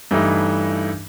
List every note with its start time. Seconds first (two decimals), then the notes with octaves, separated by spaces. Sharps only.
0.11 G2 E3 A3 D#4 E4